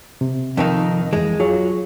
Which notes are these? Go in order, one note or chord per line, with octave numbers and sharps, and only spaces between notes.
C3
F2 D#3 D#4
F2 E3 G#3
F#3 F4 G#4